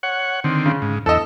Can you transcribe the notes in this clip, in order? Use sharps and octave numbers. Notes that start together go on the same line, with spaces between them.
C#5 F#5
D3 D#3 C4
C#3
G#2
E2 A4 D#5 E6